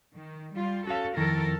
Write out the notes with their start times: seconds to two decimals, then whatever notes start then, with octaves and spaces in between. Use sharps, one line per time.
0.15 D#3
0.56 G3 F4
0.87 C#4 F#4 A4 F5
1.17 F2 D#3 E4 A4 A#4